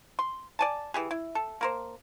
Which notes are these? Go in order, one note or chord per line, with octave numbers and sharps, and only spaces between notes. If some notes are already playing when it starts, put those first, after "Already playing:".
C6
D5 G#5 A5
E3 G4 G#4
E4
A4
A#3 A#4 C5